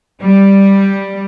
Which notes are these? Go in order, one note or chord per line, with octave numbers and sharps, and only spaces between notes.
G3